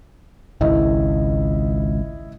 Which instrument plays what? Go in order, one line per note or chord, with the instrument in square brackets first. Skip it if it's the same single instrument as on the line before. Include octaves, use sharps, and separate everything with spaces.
[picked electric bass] G#1 C#2 [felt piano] E4 D#5